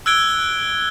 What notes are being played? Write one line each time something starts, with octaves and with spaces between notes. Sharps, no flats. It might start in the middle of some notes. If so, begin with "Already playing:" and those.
E6 F#6 G#6 D7 G7